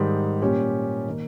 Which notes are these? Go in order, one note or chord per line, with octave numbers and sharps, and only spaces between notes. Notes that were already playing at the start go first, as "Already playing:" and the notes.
Already playing: G#2 D#3 G3
A#2 G3 C#4 G4
D#3 A#3